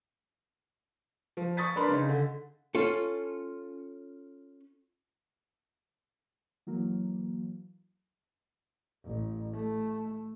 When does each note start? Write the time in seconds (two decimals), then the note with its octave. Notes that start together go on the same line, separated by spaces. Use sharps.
1.37 F3
1.57 C#6 D#6 A6 B6
1.76 D4 A#4 B4 B5 C6
1.88 C#3 D#4
2.09 D3
2.75 C#4 F4 A4
6.67 E3 F#3 A#3
9.05 A1
9.54 A3